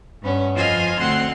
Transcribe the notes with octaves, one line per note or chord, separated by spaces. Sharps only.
G2 B3 C#4
F2 F4 C5 D#5 G#5 F6
D2 C4 F#5 C6